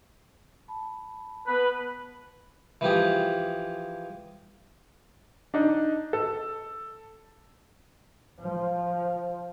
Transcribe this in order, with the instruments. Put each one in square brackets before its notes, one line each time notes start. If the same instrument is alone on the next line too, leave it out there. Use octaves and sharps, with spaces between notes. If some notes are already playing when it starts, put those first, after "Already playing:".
[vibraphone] A5 B5
[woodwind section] B3 B4
[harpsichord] E3 F3 G4 G#4
[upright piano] D4 D#4
A4
[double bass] F3